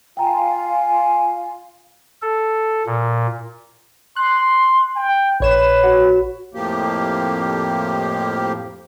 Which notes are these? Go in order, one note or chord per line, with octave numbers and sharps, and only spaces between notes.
F4 F5 G5 G#5 A#5
A4
A#2
C6 F#6
G5
A#1 B4 C#5 E7
F#4
F2 A2 F3 A#3 G4